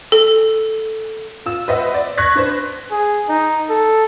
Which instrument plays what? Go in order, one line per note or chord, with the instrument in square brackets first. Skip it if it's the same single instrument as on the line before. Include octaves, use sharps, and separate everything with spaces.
[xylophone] A4
[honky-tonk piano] F4 E6
B4 C5 D#5 E5 F#5
D5
C#6 F#6 G#6 A#6 B6
D4 B4 C5
[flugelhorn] G#4
D#4
A4